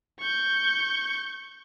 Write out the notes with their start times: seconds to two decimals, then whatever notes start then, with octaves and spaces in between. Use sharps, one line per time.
0.20 C#6 G6